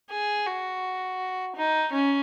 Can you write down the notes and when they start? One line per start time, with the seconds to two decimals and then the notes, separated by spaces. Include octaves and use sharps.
0.11 G#4
0.46 F#4
1.56 D#4
1.93 C#4